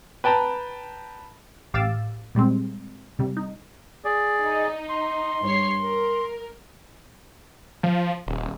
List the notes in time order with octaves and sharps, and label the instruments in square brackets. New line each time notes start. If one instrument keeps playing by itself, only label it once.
[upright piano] B4 G5 A5 A#5
[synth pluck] A1 G4 F5 D6 E6 A6
A#2 G3 G#3 C4
C3 G3
D#4
[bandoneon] G#4 D5
[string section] D#4
[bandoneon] C6
[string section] G2 C#5 C7
A#4
[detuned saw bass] F3
D#1